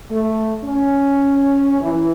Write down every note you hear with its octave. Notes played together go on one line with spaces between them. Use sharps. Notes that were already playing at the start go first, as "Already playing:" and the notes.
A3
C#4
E3